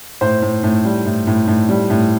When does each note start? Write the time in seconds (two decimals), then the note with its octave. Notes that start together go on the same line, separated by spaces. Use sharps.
0.21 A2 C5
0.42 A2
0.63 A2
0.84 G3
1.06 A2
1.27 A2
1.47 A2
1.69 G3
1.90 A2